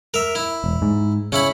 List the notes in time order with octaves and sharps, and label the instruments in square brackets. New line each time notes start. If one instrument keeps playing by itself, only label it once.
[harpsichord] A#4 E5
E4
[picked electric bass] E1
G#2
[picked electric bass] C#3 [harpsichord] C#4 E4 B5